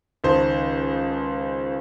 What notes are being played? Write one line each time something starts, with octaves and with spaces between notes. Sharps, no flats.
C#2 D#3 C5 A5